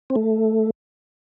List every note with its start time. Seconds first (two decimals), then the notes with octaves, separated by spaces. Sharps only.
0.10 C4
0.16 A3